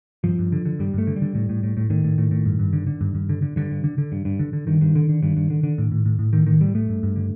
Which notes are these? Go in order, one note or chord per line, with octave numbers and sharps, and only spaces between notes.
G2 F3
G2
D3
D3
G2 G3
G2 A3
D3
G3
D3
A2
A2
A2
A2
A2 D#3
A2
A2
A2
G2
G2
D3
D3
G2
G2
D3
D3
G2 D3
G2
D3
D3
G2
G2
D3
D3
G2 D#3
G2
D3
D3
G2
G2
D3
D3
A2
A2
A2
A2
A2 D#3
A2 D#3
A2 G3
A2 A3
G2
G2
D3